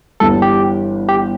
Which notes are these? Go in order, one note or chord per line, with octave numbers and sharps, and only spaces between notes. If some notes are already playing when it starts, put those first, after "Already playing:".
G1 G2 E3 G3 A4
G4
G4